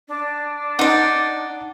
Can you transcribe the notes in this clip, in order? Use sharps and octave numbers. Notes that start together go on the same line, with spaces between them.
D4
D#4 D5 F#5